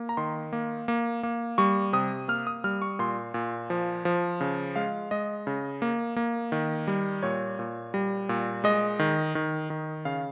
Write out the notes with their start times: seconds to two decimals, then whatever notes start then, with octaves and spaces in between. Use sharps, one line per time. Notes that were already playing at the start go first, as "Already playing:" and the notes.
Already playing: A#3
0.09 A#5
0.17 D#3 C6
0.53 A#3
0.88 A#3
1.23 A#3
1.58 G3 C#6
1.93 C3 D#6
2.28 A#3 F6
2.47 D#6
2.64 G3 F6
2.82 C#6
2.99 A#2 C6
3.34 A#2
3.70 F3
4.05 F3
4.41 C#3
4.76 G#3 F5
5.11 G#3 D#5
5.47 C#3
5.82 A#3
6.16 A#3
6.52 D#3
6.88 G3
7.23 A#2 C#5
7.59 A#2
7.94 G3
8.29 A#2
8.64 G#3 D#5
8.99 D#3
9.35 D#3
9.70 D#3
10.05 C#3 F5